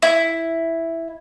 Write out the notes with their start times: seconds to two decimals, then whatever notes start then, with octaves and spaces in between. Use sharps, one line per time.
0.02 E4